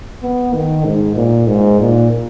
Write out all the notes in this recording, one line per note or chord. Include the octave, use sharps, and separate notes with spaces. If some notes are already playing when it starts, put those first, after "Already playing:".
B3
D#3
G#2
A#2
G#2
A#2